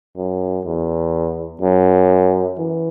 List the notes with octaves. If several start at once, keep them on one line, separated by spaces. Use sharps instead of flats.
F#2
E2
F#2
E3